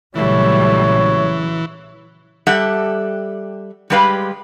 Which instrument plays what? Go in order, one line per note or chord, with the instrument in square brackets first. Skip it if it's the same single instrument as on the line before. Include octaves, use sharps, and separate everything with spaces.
[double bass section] A#1 C#3 F#3 [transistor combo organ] E3 [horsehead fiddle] G3 A3 [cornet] C#5
[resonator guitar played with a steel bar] G3 G4 A4 E5 F#5
G3 G#3 G4 B4 F5